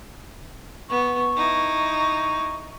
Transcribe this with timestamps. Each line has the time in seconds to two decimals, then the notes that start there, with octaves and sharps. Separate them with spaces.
0.90 B3 C#6
1.36 D#4 E4